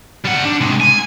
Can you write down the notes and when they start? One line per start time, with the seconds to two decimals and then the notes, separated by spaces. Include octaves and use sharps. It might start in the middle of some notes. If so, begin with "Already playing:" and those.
0.25 G3 F#5
0.45 D4
0.61 C3 G#3
0.80 G#5